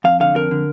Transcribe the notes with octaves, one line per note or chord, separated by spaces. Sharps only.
F2 F5
D3 F5
F2 A#4
D3